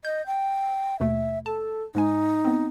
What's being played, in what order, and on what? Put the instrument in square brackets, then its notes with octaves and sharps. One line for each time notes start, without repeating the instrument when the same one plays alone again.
[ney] D#5 [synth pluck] G6
[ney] G5
[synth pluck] D#2 B2 A3 [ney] E5
[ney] A4 [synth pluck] A5
[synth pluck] G#2 G#3 G#5 [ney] D#4
[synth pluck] B3 C4